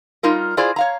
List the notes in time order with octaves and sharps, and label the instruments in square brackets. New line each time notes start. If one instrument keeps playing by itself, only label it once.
[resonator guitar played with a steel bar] G3 D#4 F4 A#4
E4 F4 G#4 C5 D5
C#5 F5 A#5